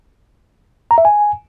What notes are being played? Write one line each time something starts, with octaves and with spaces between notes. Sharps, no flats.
A#5
E5
G#5